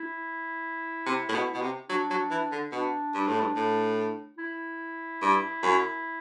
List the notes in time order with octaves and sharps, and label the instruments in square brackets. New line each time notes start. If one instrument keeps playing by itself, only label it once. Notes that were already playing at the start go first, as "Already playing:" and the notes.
Already playing: [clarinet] E4
[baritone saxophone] C3
A2
B2
B2
C3
[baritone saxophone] F#3 [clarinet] D4
[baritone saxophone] F#3
E3
D3
[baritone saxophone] B2 [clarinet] D4
[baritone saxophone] G2
A2
G2
A2
[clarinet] E4
[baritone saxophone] G2
F#2